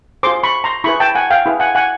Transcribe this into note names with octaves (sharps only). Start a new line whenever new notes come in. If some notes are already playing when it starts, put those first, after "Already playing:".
F4 G#4 C5 C6 D6
B5 C#6
A#5 C6
E4 G#4 B4 B5 C#6
G5 A5
F#5 G#5
F5 G5
E4 G#4 B4
F#5 G#5
F#5 G#5